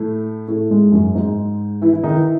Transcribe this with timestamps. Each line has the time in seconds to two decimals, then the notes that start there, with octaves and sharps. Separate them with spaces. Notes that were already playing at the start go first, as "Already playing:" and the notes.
Already playing: A2 A3
0.48 A2 A3
0.70 G#2 G#3
0.92 F#2 F#3
1.15 G#2 G#3
1.82 E3 E4
1.93 E3 E4
2.03 D#3 D#4
2.15 E3 E4